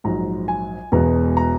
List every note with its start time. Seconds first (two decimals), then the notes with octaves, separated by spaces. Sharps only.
0.04 A#1 G#2 F#3 A#5
0.48 G#5
0.92 E1 E2 B2 G#3 B3 A#5
1.37 A#5